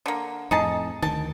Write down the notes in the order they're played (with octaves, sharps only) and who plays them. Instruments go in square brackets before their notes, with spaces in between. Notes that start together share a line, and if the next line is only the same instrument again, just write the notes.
[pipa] D3 A#3
[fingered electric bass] F2 A2 [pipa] D#4 G#4 A5
[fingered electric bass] D2 D#3 [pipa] A5